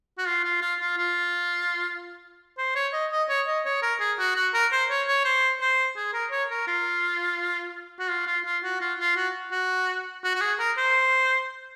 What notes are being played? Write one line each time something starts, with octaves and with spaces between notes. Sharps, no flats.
F#4
F4
F4
F4
F4
F4
C5
C#5
D#5
D#5
C#5
D#5
C#5
A#4
G#4
F#4
F#4
A#4
C5
C#5
C#5
C5
C5
G#4
A#4
C#5
A#4
F4
F#4
F4
F4
F4
F#4
F4
F4
F#4
F#4
F#4
F#4
G#4
A#4
C5